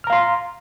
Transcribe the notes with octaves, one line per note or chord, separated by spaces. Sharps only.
F5 A#5 C6 F6